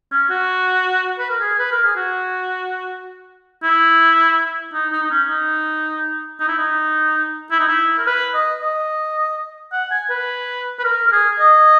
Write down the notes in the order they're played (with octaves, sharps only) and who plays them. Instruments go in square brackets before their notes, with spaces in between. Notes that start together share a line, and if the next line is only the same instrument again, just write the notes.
[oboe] C#4
F#4
B4
A#4
G#4
B4
A#4
G#4
F#4
E4
D#4
D#4
D#4
C#4
D#4
D#4
E4
D#4
E4
D#4
E4
A#4
B4
D#5
D#5
F#5
G#5
B4
B4
A#4
A#4
G#4
D#5